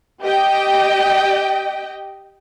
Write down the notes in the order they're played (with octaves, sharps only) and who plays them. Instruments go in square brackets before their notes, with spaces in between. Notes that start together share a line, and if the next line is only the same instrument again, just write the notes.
[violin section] G4 D#5 G5